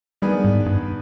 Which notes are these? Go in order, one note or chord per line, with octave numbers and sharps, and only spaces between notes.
D#3 G3 B3 D4 G#4 B4
G#2
G2